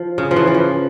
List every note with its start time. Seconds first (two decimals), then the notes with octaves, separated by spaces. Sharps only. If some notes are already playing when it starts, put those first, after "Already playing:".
Already playing: F3
0.18 C#3
0.31 F3
0.36 E3
0.47 E3
0.54 F3